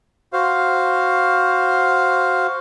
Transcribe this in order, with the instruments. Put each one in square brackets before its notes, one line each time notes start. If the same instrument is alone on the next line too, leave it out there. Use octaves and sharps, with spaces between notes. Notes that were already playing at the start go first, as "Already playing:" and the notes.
[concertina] F#4 C5 F5